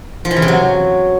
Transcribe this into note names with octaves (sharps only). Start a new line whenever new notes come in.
F3
E3
C#3
C3
F#3